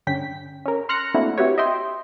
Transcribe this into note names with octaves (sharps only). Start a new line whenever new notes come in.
G2 D3 C#4 G5 B6
C#4 A#4
C6 F6 F#6 A#6 C#7
A3 A#3 C4 D4 E4 F#4
C4 E4 F#4 G4 B4 C#5
D#5 E5 G5 C6